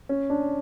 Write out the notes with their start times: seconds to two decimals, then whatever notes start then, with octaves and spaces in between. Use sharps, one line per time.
0.09 C#4
0.30 D4